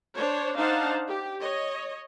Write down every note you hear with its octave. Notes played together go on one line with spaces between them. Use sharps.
D4 C5 C#5
D4 D#4 C5 F5 F#5 A5
G4
C#5 D#5